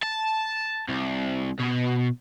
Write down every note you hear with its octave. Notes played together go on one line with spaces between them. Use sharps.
A5
C2
B2